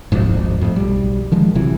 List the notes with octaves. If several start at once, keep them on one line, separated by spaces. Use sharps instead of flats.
D1 G#1 F2 G#2
F2 A2
B1 G3
D#3 F3 G#3
A1 C3 E3 F#3